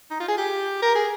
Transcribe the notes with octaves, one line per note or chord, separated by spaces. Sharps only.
D#4
F4
G#4
G4
A#4
G#4